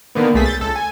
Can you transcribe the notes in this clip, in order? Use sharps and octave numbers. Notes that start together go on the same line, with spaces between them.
D3 D#3 A#3 B3
B1 A3 G#4 B6
G6 A6
C#2 A4
G#5